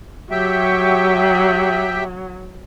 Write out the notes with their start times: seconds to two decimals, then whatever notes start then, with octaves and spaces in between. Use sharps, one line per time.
0.31 F#3 G4 E5 G5